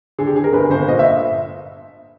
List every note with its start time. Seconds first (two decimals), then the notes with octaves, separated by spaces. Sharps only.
0.19 D3 G#4
0.27 G4
0.36 D3 G#4
0.44 A#4
0.53 G1 B4
0.70 G1 C5
0.88 A#2 D#5
0.99 E5